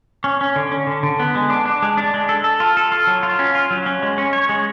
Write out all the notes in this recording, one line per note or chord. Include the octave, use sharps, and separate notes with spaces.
C#4
C#4
D3
C#4
D3
D3
B3
G#3
D4
D4
G#3
D4
G#3
A4
A4
F4
A4
F4
F#3
F4
C#4
F4
F#3
C#4
G#3
C#4
C#5
G#3